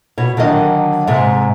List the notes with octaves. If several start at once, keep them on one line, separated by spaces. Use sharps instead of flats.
B2 C#5
D3 D#3 F#3 D#5
G#2 C3